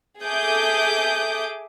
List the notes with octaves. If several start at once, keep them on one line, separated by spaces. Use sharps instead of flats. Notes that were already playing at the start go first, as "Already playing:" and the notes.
G#4 A4 E5 D6 D#6 G6